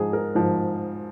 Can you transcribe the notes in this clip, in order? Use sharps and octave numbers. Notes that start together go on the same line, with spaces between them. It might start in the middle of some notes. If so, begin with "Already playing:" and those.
Already playing: G#2 F3 G#4
A#4
G#2 F3